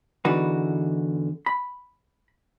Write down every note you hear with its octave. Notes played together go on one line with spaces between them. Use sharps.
E2 D3 E3 D#4 F#4 B4
B5